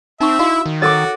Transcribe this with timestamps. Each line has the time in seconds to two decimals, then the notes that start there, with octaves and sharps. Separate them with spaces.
0.20 C4 D#4 E5 C#6
0.39 E4 F#4 D#5 F5
0.66 D#3
0.82 F#4 A4 A#4 C#5 D6 A6